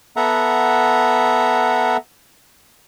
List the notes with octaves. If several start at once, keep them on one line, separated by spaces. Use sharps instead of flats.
B3 A4 E5 F#5 A#5